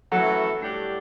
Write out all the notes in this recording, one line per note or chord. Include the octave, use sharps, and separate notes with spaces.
E3 F#3 A3 C#4 F#4 A4
A2 G3 D4 G4 D5